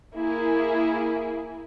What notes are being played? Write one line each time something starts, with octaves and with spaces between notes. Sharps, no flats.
A#3 E4 G#4